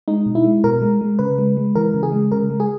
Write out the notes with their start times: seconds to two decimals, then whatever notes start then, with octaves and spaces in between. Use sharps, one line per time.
0.08 G#3 D#4
0.26 B2
0.35 E4
0.44 G#3
0.64 B2 A#4
0.82 G#3
1.01 G#3
1.19 C#3 B4
1.38 G#3
1.57 G#3
1.75 E3 A#4
1.94 C#3
2.03 G#4
2.12 G#3
2.32 C#3 A#4
2.50 G#3
2.60 G#4